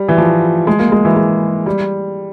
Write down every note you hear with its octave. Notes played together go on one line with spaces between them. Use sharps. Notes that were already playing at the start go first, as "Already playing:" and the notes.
Already playing: G3
E3
F3
G#3
A#3
G#3
E3
G#3
G3